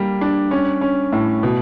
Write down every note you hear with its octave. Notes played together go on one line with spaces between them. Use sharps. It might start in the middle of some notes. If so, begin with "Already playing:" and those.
Already playing: G3 A#3
D4
C#4
C#4
A2
B2